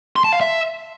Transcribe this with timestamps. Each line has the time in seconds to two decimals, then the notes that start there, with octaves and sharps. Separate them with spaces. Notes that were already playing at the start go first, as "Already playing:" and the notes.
0.16 C6
0.24 A5
0.33 F5
0.41 E5